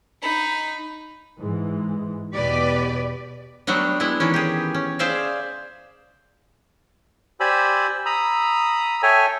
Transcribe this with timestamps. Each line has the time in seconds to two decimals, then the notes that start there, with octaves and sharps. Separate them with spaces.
0.22 D#4 B5
1.39 G#2 E3
2.34 E2 B2 G4 B4 D5
3.67 F#3 G3 A3 B3 D4
4.00 G#3 B3 E4
4.20 D#3 E3 C#4
4.34 G4 G#4
4.74 C#4
4.99 G#4 C5 D5 E5 F5
7.40 G4 C5 D5 G#5 B5 E6
8.06 A#5 B5 D#6 E6
9.03 A4 C#5 E5 G5 G#5